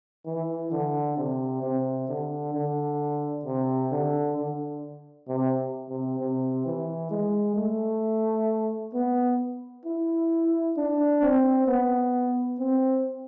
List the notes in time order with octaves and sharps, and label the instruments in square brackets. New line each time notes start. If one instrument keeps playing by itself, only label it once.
[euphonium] E3
D3
C3
C3
D3
D3
C3
D3
D3
C3
C3
C3
E3
G#3
A3
B3
E4
D4
C4
B3
C4